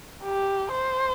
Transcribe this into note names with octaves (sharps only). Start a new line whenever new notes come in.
G4
C5